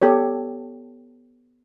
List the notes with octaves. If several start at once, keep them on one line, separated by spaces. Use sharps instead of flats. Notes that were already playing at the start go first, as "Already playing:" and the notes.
B3 G4 A4 C#5